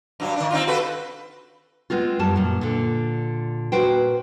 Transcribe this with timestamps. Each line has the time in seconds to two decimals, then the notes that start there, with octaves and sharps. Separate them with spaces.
0.20 G2 F#3
0.36 D#3 D4
0.51 C4 D#4 F4
0.67 F#4 A4 B4
1.90 G#3 B3 C4 F4
2.19 F#2 G3 A5
2.36 F#2 A#2
2.61 A#2 D3
3.72 A#2 F#4 B4 C5 G5